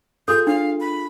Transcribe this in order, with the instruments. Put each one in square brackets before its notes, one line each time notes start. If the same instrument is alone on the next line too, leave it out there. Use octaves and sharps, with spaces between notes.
[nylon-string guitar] F4 G#4 [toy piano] A4 [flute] G6
[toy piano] D4 [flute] F5
[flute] B5